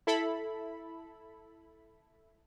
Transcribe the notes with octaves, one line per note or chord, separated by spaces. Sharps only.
E4 A4 B5